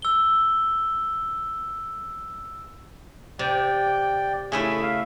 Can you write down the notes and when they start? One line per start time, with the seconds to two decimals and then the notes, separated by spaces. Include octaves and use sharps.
0.02 E6 G7
3.39 C3 D5 G5
4.52 C#3 A3 E4 G#4 E5 G#5
4.83 E5 F5